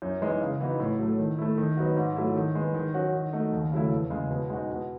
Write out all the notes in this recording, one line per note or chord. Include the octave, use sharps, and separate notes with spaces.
F#2
E3 G#3 D#4
C#3
E3 B3 D#4 F#4
A2
F#3 A3
D#3
A3 E4
D#3
F#3 B3 D#4 F#4
G#2
F#3 A3 E4
D#3
G#3 B3
D#3
F#3 C#4 F#4
D#3
A3 D#4 F#4
D#2
C#3 F#3 A3 E4
E2
C#3 G#3
B2
G#3 D#4 F#4
B2